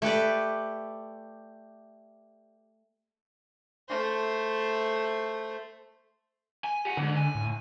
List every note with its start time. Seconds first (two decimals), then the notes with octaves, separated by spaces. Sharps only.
0.02 A3 G4 B4 D5
3.88 A3 C5
6.64 G#5
6.85 G4 F#5
6.97 F2 G#2 D3
7.16 G#5
7.35 A2